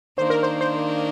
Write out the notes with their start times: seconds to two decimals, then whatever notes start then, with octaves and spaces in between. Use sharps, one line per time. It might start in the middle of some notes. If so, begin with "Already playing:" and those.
0.18 D#3 A#3 D4 C5
0.30 A#4
0.43 C5
0.61 C5